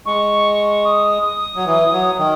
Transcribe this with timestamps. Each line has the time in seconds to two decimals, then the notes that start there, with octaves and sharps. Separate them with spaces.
0.06 G#3 C#6
0.85 D#6
1.55 F#3
1.66 E3
1.92 F#3
2.18 D#3